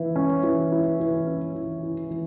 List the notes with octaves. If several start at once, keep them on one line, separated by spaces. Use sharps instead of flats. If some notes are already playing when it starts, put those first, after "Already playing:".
Already playing: E3 E4
C#4
E3
E4
E3
C#4
E3
E4
E3